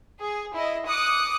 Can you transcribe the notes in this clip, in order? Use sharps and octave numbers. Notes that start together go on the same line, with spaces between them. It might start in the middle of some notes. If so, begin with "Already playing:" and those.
G#4
E4 D#5
D6 D#6 F#6 C#7